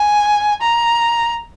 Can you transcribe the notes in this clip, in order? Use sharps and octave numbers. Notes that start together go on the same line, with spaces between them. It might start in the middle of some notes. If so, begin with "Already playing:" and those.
Already playing: G#5
A#5